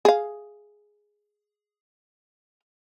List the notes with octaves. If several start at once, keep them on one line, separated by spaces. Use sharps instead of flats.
G#4 F5